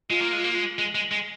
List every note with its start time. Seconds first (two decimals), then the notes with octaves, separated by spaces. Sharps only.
0.10 G#3 F4
0.21 A#3
0.33 G#3
0.44 A#3
0.55 G#3
0.79 G#3
0.95 G#3
1.12 G#3